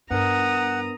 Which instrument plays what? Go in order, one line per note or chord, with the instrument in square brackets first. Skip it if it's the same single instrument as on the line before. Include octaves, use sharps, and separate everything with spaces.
[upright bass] G2 [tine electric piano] B3 D4 A#4 [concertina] F#5 [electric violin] A#5 D#6